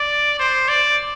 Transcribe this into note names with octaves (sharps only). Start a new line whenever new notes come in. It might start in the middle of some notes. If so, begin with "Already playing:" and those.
Already playing: D5
C5
D5